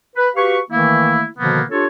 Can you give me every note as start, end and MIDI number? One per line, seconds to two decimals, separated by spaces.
0.16 0.29 71
0.36 0.59 66
0.36 0.59 67
0.36 0.59 71
0.36 0.59 77
0.36 0.59 85
0.71 1.26 51
0.71 1.26 52
0.71 1.26 57
0.71 1.26 58
0.71 1.26 64
1.39 1.62 47
1.39 1.62 50
1.39 1.62 51
1.39 1.62 53
1.39 1.62 58
1.39 1.62 59
1.71 1.86 62
1.71 1.86 65
1.71 1.86 67
1.71 1.86 69
1.71 1.86 73